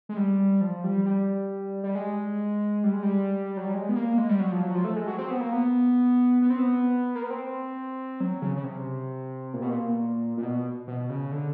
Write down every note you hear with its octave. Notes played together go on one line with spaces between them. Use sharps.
G#3
G3
F3
G3
G3
G3
G#3
G3
G#3
G3
F#3
G3
G#3
B3
A#3
G#3
G3
F#3
F3
F#3
F3
A3
G#3
F#3
C4
B3
A#3
B3
B3
C4
B3
A#3
B3
C4
F#3
C#3
C#3
C3
A#2
B2
A#2
A#2
B2
B2
C#3
D3